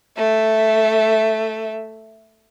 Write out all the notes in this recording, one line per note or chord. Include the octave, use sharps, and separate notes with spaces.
A3 E5